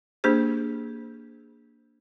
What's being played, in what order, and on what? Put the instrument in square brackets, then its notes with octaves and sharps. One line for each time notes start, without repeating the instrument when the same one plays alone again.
[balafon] A#3 D4 G4 G#4 C5